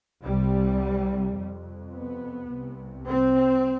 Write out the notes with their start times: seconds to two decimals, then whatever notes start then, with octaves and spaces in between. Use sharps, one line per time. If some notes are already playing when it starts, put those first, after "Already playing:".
0.23 C2 C3 G3
1.37 F2 C3
1.94 B3
2.50 C2 C3
3.07 C4